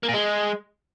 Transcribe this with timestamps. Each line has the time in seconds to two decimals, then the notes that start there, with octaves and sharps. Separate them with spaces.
0.03 A#3
0.09 A#2
0.14 G#3